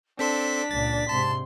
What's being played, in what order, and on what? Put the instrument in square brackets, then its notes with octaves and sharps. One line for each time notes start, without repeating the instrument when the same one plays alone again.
[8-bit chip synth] C4 A4 C5 [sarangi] D4 [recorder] B6
[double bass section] C#2 A#2 [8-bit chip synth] A6
[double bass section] G#2 C3 [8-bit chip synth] A5 [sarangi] C6